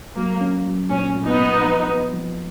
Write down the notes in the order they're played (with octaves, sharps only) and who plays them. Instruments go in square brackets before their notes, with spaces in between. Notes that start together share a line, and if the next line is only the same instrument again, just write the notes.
[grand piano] F#3 [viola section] A#3
[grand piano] C#4
F#3
[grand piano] A#2 [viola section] C#4
[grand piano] A#2
[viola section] B3 D#4
[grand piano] A#2
F3
B3
F3